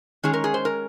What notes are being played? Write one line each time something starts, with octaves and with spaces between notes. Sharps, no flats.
D#3 G#3 C#4 G#4
A#4
G#4
C5
A#4